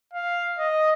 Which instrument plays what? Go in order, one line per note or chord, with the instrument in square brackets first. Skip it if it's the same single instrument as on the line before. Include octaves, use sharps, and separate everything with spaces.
[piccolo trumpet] F5
D#5